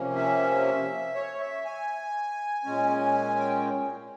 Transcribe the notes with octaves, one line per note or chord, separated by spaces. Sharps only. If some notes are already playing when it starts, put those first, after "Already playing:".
Already playing: C3 F3 A#3 C#4
E5
C#5
E5
G#5
A#2 G#3 C#4
G5